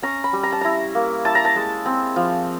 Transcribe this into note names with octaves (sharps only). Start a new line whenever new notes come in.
C#4 A#5
B5
G3
A#5
A5
E4 A#5
A#3
E4 A5
A#5
A5
G#3
C4
F3